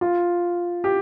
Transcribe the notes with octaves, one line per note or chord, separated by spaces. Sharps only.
F4
G4